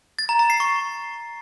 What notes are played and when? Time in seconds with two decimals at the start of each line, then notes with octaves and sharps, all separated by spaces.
0.19 A6
0.29 A#5
0.39 A#5
0.50 C7
0.60 C#6